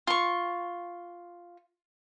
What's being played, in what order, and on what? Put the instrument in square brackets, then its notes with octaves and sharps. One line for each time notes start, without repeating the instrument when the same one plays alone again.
[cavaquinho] F4 C#6